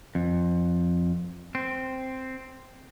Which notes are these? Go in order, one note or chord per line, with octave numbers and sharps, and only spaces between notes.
F2
C4